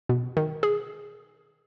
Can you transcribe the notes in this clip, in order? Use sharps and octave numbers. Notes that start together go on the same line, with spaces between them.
B2
D#3
G#4